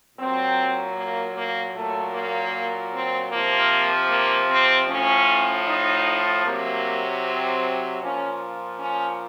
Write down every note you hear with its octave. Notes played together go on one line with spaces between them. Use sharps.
A#2 F#3 C4
A#3
A#3
A#2 F#3 A3
A#3
C4
C3 F3 A#3
A#3
C4
A2 F3 C#4
D#4
C3 F#3 A#3
C4
A#2 F3 C#4
C#4